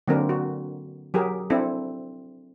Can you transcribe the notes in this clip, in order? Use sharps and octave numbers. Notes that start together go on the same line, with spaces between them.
D3 F#3 A#3 C4 D4 A#4
F#4
F#3 G4 G#4 A#4
C4 D4 E4 A4